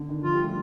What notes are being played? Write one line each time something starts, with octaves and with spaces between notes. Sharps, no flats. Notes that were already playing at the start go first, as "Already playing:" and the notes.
Already playing: D3
D#3
F3 F4
G3
A3